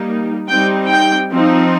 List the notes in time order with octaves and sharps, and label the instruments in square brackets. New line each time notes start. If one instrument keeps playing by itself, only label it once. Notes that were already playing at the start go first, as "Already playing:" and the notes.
Already playing: [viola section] G3 A#3 D#4
G3 C4 D#4 G5
G5
F3 C4 D#4